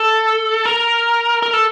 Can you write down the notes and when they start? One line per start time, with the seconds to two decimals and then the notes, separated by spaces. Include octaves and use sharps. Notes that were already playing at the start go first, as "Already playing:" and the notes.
Already playing: A4
0.65 A#4
1.43 A#4
1.53 A4